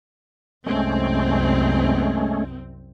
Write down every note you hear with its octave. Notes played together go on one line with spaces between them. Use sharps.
C2 F#2 G#3 A3 C4 C#4